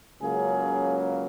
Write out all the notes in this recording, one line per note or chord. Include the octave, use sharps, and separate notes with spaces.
C#2 C#3 F#3 A#3 G#4